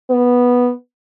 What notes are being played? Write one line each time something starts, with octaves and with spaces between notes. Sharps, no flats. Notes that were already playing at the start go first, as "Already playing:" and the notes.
B3